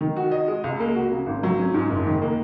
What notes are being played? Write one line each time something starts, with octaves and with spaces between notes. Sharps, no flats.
D#3
F#4
D#5
G#3
C#2
A#3
F#4
C#3
G#1
F#3
C#4
G#2
F#1
D#3
A#3